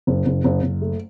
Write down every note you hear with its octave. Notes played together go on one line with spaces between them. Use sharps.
F#1
F#1
F#1
F#1
A3